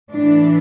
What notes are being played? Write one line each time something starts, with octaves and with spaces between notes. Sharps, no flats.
A2 E3 D4